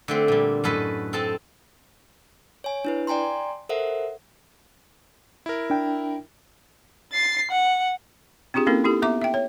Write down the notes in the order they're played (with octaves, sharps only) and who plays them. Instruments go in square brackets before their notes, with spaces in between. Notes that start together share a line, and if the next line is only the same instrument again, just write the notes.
[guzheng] D3 A3 C4
A#2 G3
F#2 A2 A4 B4 D#5
C4 A4 D#5 A5
[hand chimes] C#5 G#5
D4 E4 B4
D5 G5 G#5 A#5 C6
A4 A#4 C5 E5 F#5
[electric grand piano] E4 A#4
[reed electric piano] D4 G5
[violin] A6 C7
F#5
[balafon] C4 D4 F4 G4 G#4
A#3 C4 C#4 E4 A4 A#4
D#4 E4 G4 A4
B3 E5 A#5 D6
E5 G5
C#5